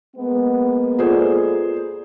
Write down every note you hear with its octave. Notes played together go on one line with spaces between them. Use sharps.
G#3 A#3 B3
F4 G#4 A4 C5 D5